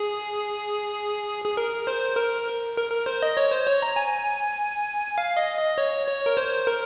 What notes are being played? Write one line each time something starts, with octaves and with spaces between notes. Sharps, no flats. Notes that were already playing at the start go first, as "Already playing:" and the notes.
Already playing: G#4
G#4
A#4
C5
A#4
A#4
A#4
C5
D#5
C#5
C5
C#5
A#5
G#5
F5
D#5
D#5
C#5
C#5
A#4
C5
A#4